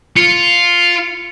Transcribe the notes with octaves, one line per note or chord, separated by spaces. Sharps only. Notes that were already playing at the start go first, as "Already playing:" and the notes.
F4 C#7